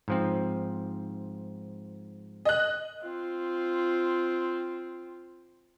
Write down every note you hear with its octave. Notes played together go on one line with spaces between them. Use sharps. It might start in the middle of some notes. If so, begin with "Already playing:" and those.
G#2 F3 C4
D#5 F#6
C4 F4